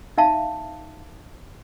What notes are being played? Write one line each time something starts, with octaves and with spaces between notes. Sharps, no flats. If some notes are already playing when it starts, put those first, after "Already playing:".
D#4 E5 F5 A5